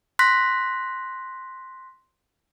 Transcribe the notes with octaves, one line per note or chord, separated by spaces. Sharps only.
C6 F#6 A#6 B6